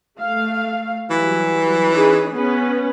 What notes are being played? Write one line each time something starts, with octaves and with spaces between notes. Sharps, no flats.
A3 F5
E3 F#3 G3
C#4 D#4 G#4
B3 C#4 B4